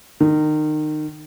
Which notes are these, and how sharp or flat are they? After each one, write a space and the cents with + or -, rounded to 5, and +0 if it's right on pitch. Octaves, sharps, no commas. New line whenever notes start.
D#3 -25